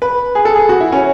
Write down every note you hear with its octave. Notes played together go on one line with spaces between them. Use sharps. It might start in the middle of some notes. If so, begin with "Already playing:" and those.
B4
G#4
A4
G#4
F#4
E4
C#4